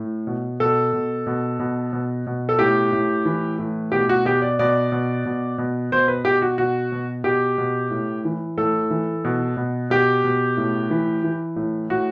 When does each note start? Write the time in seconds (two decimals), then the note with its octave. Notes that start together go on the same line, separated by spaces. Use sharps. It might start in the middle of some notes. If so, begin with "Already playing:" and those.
Already playing: A2
0.27 B2
0.60 B2 A4
0.93 B2
1.27 B2
1.59 B2
1.93 B2
2.27 B2
2.49 A4
2.59 A2 G4
2.92 A2
3.25 E3
3.59 A2
3.92 B2 G4
4.09 F#4
4.25 B2 G4
4.42 D5
4.59 B2 D5
4.92 B2
5.25 B2
5.58 B2
5.92 B2 C5
6.08 B4
6.25 B2 G4
6.42 F#4
6.58 B2 F#4
6.92 B2
7.24 B2 G4
7.58 B2
7.91 A2
8.25 E3
8.57 A2 A4
8.91 E3
9.24 B2
9.57 B2
9.90 B2 G4
10.24 B2
10.57 A2
10.90 E3
11.24 E3
11.56 A2
11.90 A2 F#4